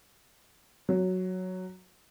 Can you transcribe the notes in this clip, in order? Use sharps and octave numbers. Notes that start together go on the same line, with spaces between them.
F#3